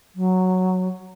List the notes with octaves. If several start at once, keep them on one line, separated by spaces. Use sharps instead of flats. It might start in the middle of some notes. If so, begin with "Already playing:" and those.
F#3